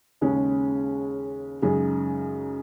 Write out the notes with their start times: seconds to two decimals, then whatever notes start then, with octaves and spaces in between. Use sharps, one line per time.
0.21 D#2 C#3 G#3 C#4
1.62 F#2 C#3 G#3 D#4 G#4